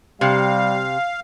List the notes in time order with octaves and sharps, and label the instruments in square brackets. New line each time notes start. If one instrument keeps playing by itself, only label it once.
[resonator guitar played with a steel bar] C3 [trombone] G3 [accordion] F5